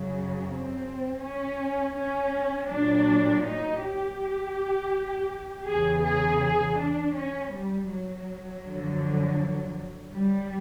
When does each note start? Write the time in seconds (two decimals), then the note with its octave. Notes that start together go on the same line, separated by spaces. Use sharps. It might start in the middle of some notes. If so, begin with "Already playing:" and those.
Already playing: F#2 C#3 F#3
0.47 C4
1.22 C#4
1.95 C#4
2.70 A#2 F#3 D4
3.44 D#4
3.81 G4
5.68 E2 C#3 E3 G#4
6.05 G#4
6.42 G#4
6.79 D4
7.16 C#4
7.53 G3
7.91 F#3
8.66 F#2 D3 F3
10.14 G3